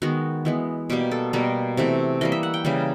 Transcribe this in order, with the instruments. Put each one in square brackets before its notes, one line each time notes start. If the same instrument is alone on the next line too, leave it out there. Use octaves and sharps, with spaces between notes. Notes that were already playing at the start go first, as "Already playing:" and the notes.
[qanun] D#3 G#3 B3 F#4
E3 G#3 B3
B2 G3 A#3 G4
A4
B2 G3 A#3 A#4
C3 E3 A3
E3 G3 A#3 D#5
E5
F#5
G5
C#3 E3 G3 A#3